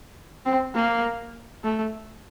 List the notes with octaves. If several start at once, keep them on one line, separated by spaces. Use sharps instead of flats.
C4
A#3
A3